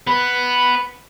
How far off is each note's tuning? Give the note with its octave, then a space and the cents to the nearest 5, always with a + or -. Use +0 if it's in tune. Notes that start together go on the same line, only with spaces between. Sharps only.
B3 +0 B4 +0